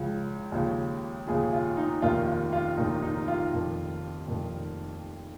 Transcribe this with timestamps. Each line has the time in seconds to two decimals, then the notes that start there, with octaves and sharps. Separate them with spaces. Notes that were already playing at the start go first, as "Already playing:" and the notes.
Already playing: C#2 C#3 F3
0.52 D#2 C#3 F3
1.27 D#2 C#3 F3 G#4
1.53 F4
1.77 D#4
2.02 F1 D#2 D#3 F4
2.28 F4
2.53 F4
2.77 F1 D#2 D#3 D#4
3.02 D#4
3.28 F4
3.53 F1 F2 D#3
4.28 F1 F2 D#3